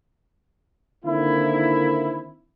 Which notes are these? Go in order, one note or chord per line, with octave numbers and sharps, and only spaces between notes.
D3 D#3 A#3 C4 E4